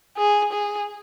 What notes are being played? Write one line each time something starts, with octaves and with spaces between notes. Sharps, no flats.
G#4
G#4